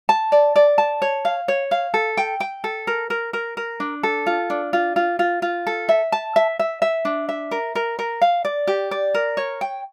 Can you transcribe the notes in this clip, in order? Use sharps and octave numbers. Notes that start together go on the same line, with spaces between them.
A5
D5
D5
A5
C#5
F5
C#5
F5
A4
G5
G5
A4
A#4
A#4
A#4
A#4
D4
A4
F4
D4
F4
F4
F4
F4
A4
E5
A5
E5
E5
E5
D4
E5
A#4
A#4
A#4
F5
D5
G4
D5
A#4
C#5
G5